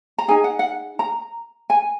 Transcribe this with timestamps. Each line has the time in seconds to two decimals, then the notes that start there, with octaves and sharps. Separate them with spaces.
0.18 A#5
0.28 D#4 G#4 G#5
0.44 F#5
0.59 F#5
0.99 A#5
1.70 G#5